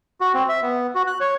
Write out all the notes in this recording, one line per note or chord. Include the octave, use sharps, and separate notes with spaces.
F#4
C4
E5
B3
F#4
F#6
C#5